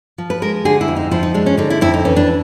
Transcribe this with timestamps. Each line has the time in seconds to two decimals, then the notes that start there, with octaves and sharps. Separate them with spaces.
0.18 F3
0.30 B4
0.42 G#3 A#4
0.65 D3 G#4
0.81 E4
0.88 F2
0.96 D#4
1.11 F3 E4
1.23 D#4
1.34 G#3 D4
1.46 C#4
1.58 D3 D#4
1.70 E4
1.81 F2 E4
1.94 D#4
2.05 E3 C#4
2.16 D4